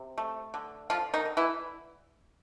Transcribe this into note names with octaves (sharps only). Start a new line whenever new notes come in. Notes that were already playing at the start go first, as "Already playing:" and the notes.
Already playing: C3
A3
D3
D3 F3 F4
D#3 D#4
D3
E3 E4